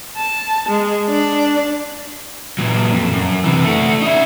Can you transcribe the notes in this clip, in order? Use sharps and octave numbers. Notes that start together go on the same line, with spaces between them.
A5
G#3
D4 D5
A#2 F#3
F2
F#2
C3 E3
A3 F#4
D#4 E5